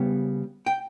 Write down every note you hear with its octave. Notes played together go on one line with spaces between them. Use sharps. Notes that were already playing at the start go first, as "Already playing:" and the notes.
Already playing: C#3 G3 B3
G5